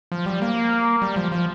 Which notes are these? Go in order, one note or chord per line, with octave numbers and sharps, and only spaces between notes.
F3
G3
A#3
G3
F3
F3